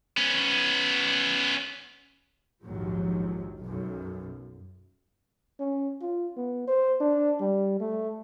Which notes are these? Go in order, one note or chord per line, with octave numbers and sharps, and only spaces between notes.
B3 C#4
A#1 D#2 G#2 F3 F#3
B1 F#2
C#4
F4
B3
C5
D4
G3
A3